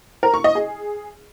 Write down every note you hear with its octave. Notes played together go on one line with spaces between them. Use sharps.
A#4
C#6
D#5
G#4